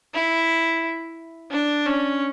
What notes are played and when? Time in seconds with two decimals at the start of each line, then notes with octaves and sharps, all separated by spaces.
0.14 E4
1.50 D4
1.85 C#4